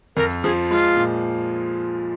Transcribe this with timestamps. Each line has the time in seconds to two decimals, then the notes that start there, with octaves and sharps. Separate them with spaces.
0.16 F2 A#4
0.43 F3 G#4
0.71 G#3 F4
0.96 A#2